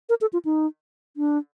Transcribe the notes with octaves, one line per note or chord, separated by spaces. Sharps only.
A#4
A4
F4
D#4
D4